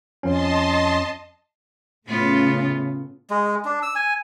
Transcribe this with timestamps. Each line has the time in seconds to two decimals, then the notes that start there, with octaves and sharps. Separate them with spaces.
0.23 F2 F3 C#4 D#5 A5 C6
2.07 A2 C#3 A3 B3 F4
3.30 G#3
3.65 D4
3.82 E6
3.95 G#5